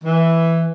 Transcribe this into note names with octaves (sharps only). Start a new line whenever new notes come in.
E3